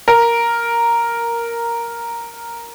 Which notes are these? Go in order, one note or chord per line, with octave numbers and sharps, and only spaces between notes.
A#4